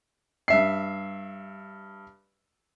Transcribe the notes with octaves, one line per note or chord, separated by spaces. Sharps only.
G2 E5 C7